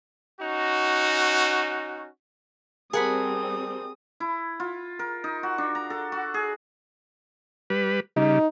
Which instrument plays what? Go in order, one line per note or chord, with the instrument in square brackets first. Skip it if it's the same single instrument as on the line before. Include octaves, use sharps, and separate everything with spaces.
[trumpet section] C#4 D#4 F#4
[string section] G3 C4 [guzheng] G#4 F#5 B5 [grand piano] A#4 A5 [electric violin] D#6
[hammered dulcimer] E4
F4
A#4
D#4
F#4
D4
A#5
A4
F#4
G#4
[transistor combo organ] G3 B4
[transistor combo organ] C#3 G3 [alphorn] D#4